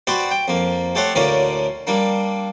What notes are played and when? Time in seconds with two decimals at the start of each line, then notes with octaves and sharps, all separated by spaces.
0.07 F#4 G4 B4 C5 D5
0.31 G5
0.48 F2 A#3
0.95 A3 G4 A4 C5 C#5 F#5
1.15 D2 A2 D3 A#3 C#4 D5
1.87 G3 A#3 D4